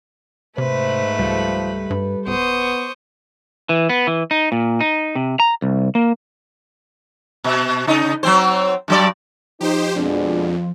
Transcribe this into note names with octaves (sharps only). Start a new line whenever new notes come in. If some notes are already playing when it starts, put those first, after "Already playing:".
G#2 C3 A3 B4 C5
C#2 F3 G3 G4 A4
G2 B4
D1 B3 C5 C#6 D#6
E3
B3
E3
D#4
A#2
D#4
C3
A#5
C2
A#3
B2
C#3 D#4
F#3 C4 C5
G2 F#3 D5
F3 D#4 G4 C5
F2 B2 G#3 D4